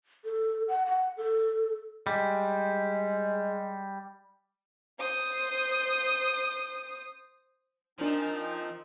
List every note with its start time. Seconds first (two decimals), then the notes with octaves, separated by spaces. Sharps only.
0.25 A4
0.68 F#5
0.86 F#5
1.17 A4
2.07 G3 G#3
5.00 C5 D#6
7.99 F3 C4 D4 D#4 A#4 G#5